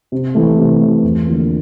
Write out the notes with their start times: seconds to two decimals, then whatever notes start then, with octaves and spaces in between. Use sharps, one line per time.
0.12 C3
0.35 E3 A3
0.58 C3
0.80 E3 A3
1.03 E2
1.27 D3 F3 A#3